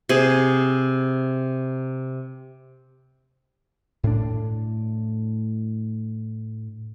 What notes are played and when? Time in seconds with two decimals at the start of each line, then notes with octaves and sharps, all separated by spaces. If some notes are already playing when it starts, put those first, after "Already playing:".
0.09 C3 G#4
4.03 A2 D4